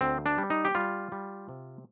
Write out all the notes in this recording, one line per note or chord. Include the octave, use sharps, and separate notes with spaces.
D2 C4
D4
G3
D#4
G4
G3 F4
G3
C3